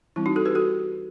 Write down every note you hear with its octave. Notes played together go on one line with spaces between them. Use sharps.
E3 G3 C4 E4
D#4 F#4
F#4 A4
G4 B4
F#4 A4